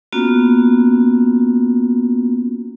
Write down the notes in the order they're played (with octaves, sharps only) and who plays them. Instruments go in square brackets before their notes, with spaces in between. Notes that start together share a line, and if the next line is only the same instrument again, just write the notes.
[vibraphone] A#3 B3 C#4 F4 F#4